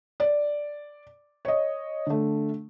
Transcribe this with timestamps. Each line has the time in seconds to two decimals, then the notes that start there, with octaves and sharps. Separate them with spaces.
0.20 D5
1.45 C#5 D#5
2.07 D3 A3